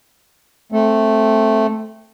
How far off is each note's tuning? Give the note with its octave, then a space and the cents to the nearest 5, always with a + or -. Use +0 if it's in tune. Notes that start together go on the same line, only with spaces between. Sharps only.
A3 +0 C4 +5